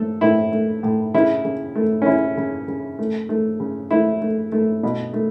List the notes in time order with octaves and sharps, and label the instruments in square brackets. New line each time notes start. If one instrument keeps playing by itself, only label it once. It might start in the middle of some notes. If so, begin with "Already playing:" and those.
Already playing: [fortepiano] A3 A4
A2 E4
A3
A2
C#3 E4
C#3
A3
C#4
C#3 E4
C#3
C#3
A3
A3
C#3
A3 E4
A3
A3
B2
A3